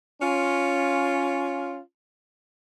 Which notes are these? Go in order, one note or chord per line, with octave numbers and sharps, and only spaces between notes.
C#4 F4